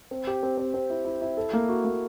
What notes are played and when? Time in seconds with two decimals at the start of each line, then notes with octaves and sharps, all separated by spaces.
0.11 C4
0.27 G4
0.43 C4
0.58 C4
0.74 C4
0.90 E4
1.05 E4
1.22 E4
1.37 A4
1.53 A#3
1.69 F#4
1.85 A#3